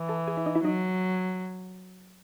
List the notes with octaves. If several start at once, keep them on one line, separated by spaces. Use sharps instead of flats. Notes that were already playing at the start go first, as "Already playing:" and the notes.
Already playing: E3
A4 A5
G#4 G#5
E4 E5
D#4 D#5
E4 E5
F#3 D#4 D#5